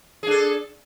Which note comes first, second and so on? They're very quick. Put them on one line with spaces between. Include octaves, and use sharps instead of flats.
G#4 D4 A4